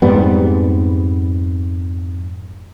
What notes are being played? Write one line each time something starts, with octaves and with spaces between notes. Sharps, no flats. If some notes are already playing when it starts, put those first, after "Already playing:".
F2 G#2 G3 B3